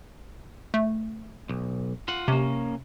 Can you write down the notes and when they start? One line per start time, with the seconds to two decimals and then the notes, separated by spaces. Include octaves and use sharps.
0.74 A3
1.49 B1
2.08 F4 F#5
2.28 C3 A#3 C#4